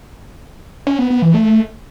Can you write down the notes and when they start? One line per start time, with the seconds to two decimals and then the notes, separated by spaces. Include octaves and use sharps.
0.87 C#4
0.99 B3
1.10 B3
1.22 E3
1.34 A3